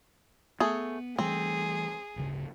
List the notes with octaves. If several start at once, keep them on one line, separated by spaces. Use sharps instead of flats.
A3 B3 G#4
E3 G3 A3 C4 G#4
D1 G1 C#3